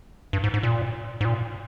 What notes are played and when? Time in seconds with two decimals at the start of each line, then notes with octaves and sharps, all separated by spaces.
0.33 G2
0.44 G#2
0.54 G#2
0.63 A#2
1.21 G#2
1.25 A#2